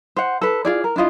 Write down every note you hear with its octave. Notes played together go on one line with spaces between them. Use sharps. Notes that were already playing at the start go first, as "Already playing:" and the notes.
C5 F#5
A4 B4
F4 G#4 D5
A#4
D4 E4 F4 D#5